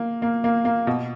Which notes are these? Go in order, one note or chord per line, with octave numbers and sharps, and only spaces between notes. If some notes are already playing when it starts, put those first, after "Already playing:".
Already playing: A#3
A#3
A#3
A#3
B2